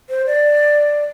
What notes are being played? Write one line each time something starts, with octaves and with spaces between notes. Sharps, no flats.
C5
D5